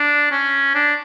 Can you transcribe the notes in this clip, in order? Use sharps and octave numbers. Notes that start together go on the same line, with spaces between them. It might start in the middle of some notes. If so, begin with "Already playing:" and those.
Already playing: D4
C#4
D4